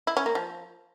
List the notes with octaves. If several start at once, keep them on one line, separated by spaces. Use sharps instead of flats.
E4
C#4
A#3
F3